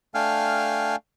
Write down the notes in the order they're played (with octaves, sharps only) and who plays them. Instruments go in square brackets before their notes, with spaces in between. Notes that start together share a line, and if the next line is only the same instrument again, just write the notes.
[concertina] A3 D4 F5 G5 G#5 F6